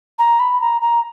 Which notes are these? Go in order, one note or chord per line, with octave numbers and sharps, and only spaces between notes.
A#5
B5
A#5
A#5